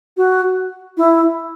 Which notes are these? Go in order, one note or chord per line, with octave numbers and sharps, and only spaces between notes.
F#4
E4